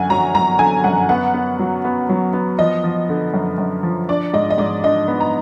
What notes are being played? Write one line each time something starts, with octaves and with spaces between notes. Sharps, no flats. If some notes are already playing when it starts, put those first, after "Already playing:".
Already playing: F#2 D3 F#5 G#5
F#3 A#5
F#3 A#5
D3 G#5
F#2 F#5
B3 F#5
B3
F#3
B3
F#3
B3
F3 D#5
F3
D3
F#2
F#2
F3
D4 D5
G#2 D#5
D#5
G#2 D5
D4 D#5
B3
A#5